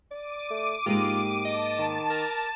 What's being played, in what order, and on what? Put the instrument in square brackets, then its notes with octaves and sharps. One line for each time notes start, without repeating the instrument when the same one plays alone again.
[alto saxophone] D5 [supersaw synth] D6 D#7
[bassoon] A3
[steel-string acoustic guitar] G#2 G#3 A#3 [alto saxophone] F4 [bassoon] G4
[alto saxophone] D#5 [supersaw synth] A5
[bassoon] D#3
[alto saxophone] A#4